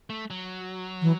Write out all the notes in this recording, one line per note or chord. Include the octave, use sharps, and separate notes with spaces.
A3
F#3
E3